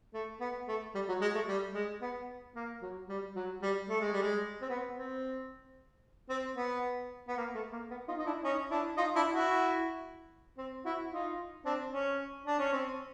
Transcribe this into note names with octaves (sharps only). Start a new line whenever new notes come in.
A3
B3
A3
G3
F#3
G#3
A3
G3
G#3
B3
A#3
F#3
G3
F#3
G3
A3
G#3
G3
G#3
C4
B3
C4
C4
B3
B3
A#3
A3
A#3
B3
D#4 F4
D#4
D4 E4
C#4 D#4
D4 E4
D#4 F4
D4 E4
E4 F#4
C4
E4 F#4
D#4 F4
C4 D4
C#4
D4
C#4
C4